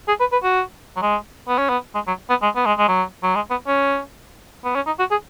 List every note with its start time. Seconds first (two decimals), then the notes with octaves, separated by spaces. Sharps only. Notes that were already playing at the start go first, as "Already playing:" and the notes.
0.08 G#4
0.20 B4
0.32 B4
0.44 F#4
0.97 F#3
1.02 G#3
1.48 B3
1.58 C#4
1.69 B3
1.95 G#3
2.07 F#3
2.30 B3
2.42 G#3
2.56 B3
2.66 G#3
2.78 G#3
2.88 F#3
3.23 F#3
3.35 G#3
3.51 B3
3.67 C#4
4.64 B3
4.75 C#4
4.86 D#4
4.99 F#4
5.11 G#4